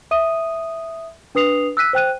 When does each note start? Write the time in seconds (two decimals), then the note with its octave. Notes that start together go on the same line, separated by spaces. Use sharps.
0.11 E5 D#6 D#7
1.35 D4 B4 D#6 C7 F7
1.77 E6 F#6 B6 D#7
1.93 C5 G5 F#6 D#7